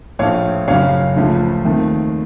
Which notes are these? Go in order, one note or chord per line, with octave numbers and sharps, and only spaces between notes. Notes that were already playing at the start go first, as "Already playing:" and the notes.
A#1 A2 A3 C#5 F5
F#1 F#2 C#3 C#5 F5
C#2 C#3 F3 A3
D#2 D#3 A3 C4